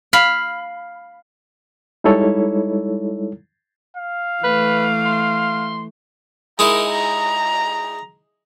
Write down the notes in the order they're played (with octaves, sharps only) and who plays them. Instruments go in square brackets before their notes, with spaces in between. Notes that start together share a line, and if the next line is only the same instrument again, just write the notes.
[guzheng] F5 B5
[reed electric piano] G3 G#3 D#4 E4 A4 C#5
[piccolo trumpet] F5
[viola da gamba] E3 A3 [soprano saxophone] B4
[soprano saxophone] C6
[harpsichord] G#3 D#4 E4 [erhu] A#4
[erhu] A#5